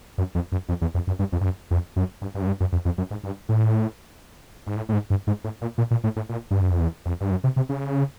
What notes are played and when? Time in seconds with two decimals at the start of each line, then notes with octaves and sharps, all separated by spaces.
0.18 F#2
0.35 F2
0.52 F#2
0.69 F2
0.81 E2
0.95 F2
1.07 F#2
1.19 G2
1.32 F2
1.41 G2
1.45 F#2
1.71 F2
1.96 F#2
2.22 G2
2.35 G2
2.42 F#2
2.47 G2
2.60 F#2
2.72 F2
2.85 F2
2.98 F#2
3.11 G#2
3.23 G2
3.49 A2
4.67 G#2
4.76 A2
4.89 A2
4.93 G#2
5.10 G2
5.27 G#2
5.44 A2
5.61 A#2
5.78 A#2
5.91 A#2
6.04 A2
6.16 A2
6.29 A#2
6.51 G2
6.61 F#2
6.71 F2
6.80 E2
7.05 F2
7.20 G2
7.31 F#2
7.44 C3
7.56 C3
7.69 C#3